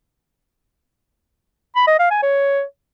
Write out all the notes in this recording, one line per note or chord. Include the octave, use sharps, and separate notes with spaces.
B5
D#5
F5
G#5
C#5